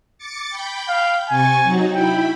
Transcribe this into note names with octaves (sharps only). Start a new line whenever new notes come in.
D6 A6 C#7
G5 B5 G6
F5
C3 G#5 C#6 A6
F#3 D#4 F#4
E4 G5 B5